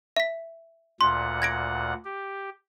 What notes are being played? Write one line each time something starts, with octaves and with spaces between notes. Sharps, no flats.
E5 B6
D2 A#2 F#5 C6
G#6 A#6 D7
G4